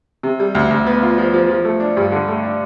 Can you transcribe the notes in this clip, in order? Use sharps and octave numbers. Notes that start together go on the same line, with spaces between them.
C3
G3
D2
D2
B3
F4
F3
F3
F3
A3
D4
G2
D3
A3
D4